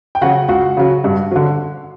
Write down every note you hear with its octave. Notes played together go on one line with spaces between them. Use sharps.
G5
C#3 F#3 F#4 F#5
C#2 F#4 F#5
C#3 F#3
G2
D3 F#3